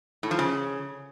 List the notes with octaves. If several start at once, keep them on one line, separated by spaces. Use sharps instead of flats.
A2
F3
C#3